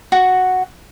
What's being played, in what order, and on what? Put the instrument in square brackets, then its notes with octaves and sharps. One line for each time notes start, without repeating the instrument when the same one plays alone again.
[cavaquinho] F#4